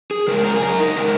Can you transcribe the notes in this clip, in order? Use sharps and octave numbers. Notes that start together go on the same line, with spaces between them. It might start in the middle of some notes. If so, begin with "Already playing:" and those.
G#4
C#3 G#3 A#4
A#4
G#4
F#2 A#4
D#4
C#3 G#3 A#4